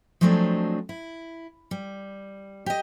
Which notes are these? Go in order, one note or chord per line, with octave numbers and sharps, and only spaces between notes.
F3 F#3 G#3 A3 C4 D4
E4
G3
G4 D#5